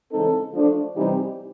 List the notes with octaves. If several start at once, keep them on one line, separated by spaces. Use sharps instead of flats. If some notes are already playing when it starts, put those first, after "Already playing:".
C#3 E3 G#3 C4 D#4 A4
F3 A3 D4
C3 E3 G3 C4 D#4 G4